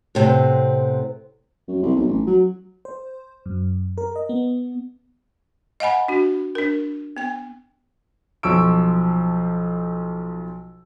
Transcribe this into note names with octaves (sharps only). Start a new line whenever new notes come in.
A2 C3 B3 C4
F#2
C2
B1
A1
F#3
C5
F#2
A#4
D#5
B3
D#5 F5 F#5 G#5 B5
D4 F#4
D4 A#4
B3 G5
B1 F3 C5 C#6 E6 D7